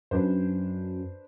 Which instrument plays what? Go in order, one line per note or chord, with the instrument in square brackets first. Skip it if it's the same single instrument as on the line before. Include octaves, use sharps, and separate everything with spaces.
[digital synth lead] F#2 [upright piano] D4 B4 C5